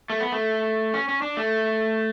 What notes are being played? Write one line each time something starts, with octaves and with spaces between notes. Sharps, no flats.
A3
B3
A3
C#4
C#4
D4
A3